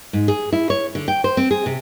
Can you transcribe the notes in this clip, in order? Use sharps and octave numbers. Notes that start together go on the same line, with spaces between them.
G#2
G#4
E4
C#5
D3
G5
C5
C4
G#4
C3